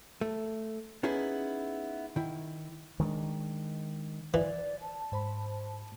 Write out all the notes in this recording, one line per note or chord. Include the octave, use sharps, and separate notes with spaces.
A3
B3 C#4 D#4 E4 G#4
D#3 E4
D#3 G#3 C4 D4
E3 D5
A5
G#2 C5 B5